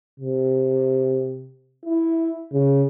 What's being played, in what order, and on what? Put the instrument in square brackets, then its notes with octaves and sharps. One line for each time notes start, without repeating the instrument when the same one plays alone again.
[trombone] C3
E4
C#3